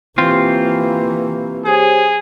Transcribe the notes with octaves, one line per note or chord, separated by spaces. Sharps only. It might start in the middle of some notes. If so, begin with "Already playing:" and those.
E3 A#3 C4 F4 G4 C#6
G4 G#4 C5 C#5